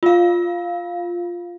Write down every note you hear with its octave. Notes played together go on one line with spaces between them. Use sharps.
F4 F5